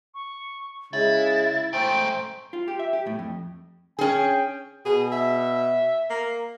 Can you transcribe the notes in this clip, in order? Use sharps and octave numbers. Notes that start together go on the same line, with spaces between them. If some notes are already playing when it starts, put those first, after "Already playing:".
C#6
C#3 G#3 E4 A6
G#2 A3 C5 G5 D7
F4
G4
E5
G4
A2
F2
C#4 G#4 G5
B2 G#4
E5
A#3